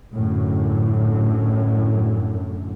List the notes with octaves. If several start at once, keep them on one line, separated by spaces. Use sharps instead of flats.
F#2 A2 D3